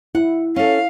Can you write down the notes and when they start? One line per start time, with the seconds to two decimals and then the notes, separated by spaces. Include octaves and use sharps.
0.15 E4 F#5
0.56 C#4 A4 F5